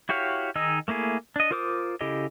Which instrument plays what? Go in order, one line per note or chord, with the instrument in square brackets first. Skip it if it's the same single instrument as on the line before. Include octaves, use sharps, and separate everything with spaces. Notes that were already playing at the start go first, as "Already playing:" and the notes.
[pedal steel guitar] E4 F#4 G4 C#5 F5
D#3 D#4 G#4 D#5 E6
A3 A#3 E4 G#4
D4 D#5
F4 A#4 C5 D6 D#6
C#3 E4 G4 A4 D#5